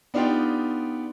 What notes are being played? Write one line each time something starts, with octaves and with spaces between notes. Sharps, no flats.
B3 D4 D#4 F4 G4 G5